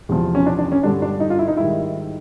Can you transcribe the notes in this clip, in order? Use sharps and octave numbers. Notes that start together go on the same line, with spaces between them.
E2 C3 F3
C#4
D4
D4
C#4
G2 D3 G3 D4
D4
D#4
F4
E4
D#4
G#2 D#3 G3 E4